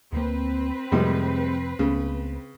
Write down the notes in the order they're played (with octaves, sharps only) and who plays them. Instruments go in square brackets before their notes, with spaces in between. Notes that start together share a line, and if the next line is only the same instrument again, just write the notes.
[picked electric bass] D2 A#3 [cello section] C4 B4
[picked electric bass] F2 C3 F3 [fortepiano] A2 G3 G#3
[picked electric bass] C#2 A3 B3 [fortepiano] C#3